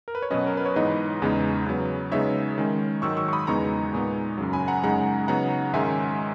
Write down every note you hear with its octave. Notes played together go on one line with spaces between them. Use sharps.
A#4
B4
C#5
B2 F#3 C#4 B4 D#5
A#4
B4
C#5
G#2 E3 B3 D#4 B4 D#5
E2 C#3 G#3 B3 D#4
C#3 F#3 B3
C#3 G#3 B3 D#4 C#5 E5
D#3 G#3 C#4
G#2 D#3 F#3 C#6 E6
C#6 E6
C#6
B5 D#6
E2 C#3 G#3 B3 D#4 A#5 C#6
A#2 G#3 B3 D#4
F#2 C#3 F#3
G#5 B5
F#5 A#5
F#2 C#3 G#3 D#4 F#5 A#5
C#3 F#3 B3 D#4 F#5 A#5
G#2 D#3 G#3 C#4 E5 G#5